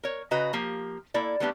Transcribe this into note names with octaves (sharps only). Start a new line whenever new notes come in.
A#4 C#5
C#3 F#4 B4 D#5 A#5
F3 A#3 G4
A#3 E4 A4 D5
G3 A3 B3 D4 D#4 G4